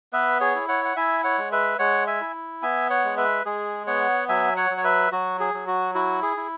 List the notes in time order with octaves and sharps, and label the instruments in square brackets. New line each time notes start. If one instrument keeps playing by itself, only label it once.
[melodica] B3 B4 E5
G#4 C#5
E4
C#5 F#5
F#5
E4 E5 G#5
C#5 F#5
G#3
B4 E5
G#3 C#5 F#5
E5 G#5
E4
B3 E5 G#5
C#5 F#5
G#3
B4 E5
G#3 G#4
B3 C#5 F#5
F#3 E5 G#5
C#5 F#5
F#3
C#5
B4 E5
F#3 F#4
G#4
F#3
F#4
E4 F#4
G#4
E4